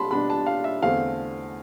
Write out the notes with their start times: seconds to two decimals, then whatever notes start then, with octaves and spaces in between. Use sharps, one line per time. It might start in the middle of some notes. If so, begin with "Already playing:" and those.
Already playing: G3 B3 D4 A5 B5 C6
0.11 B2 G3 B3 D4 B5
0.30 A5
0.46 F5
0.64 E5
0.82 E2 D3 A3 C4 F5